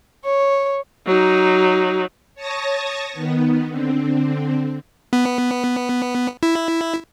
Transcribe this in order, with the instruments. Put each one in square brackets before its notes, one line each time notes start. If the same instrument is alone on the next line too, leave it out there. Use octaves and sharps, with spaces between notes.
[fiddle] C#5
[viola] F#3 D#4
[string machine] C#5 A5 C#6 D#6 A#6
D#3 B3
D3 C4
[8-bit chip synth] B3
E4